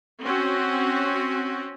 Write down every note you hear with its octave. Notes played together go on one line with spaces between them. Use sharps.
C4 C#4 F#4